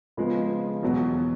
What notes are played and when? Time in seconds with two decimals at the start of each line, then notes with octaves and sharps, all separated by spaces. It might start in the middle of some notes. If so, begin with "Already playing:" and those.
0.17 C#3 F3 G#3 B3
0.83 E2 B2 F#3